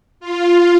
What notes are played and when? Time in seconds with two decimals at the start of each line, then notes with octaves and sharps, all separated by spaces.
0.20 F4